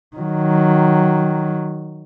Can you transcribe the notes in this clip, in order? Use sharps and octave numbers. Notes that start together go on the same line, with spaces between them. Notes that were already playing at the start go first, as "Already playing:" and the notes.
D#3 F#3